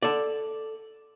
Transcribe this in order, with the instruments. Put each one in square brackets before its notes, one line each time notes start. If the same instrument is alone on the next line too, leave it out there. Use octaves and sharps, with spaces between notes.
[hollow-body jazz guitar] A4 D5